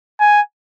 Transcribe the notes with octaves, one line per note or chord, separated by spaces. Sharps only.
G#5